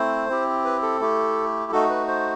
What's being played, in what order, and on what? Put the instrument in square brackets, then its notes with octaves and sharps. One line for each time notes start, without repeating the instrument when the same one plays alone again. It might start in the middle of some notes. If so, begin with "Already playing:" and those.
Already playing: [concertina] A3 C4 E4 C5
C4 E4 G4
B4
A4
A3 E4 G4
A3 D#4 F#4 A4
B4
C5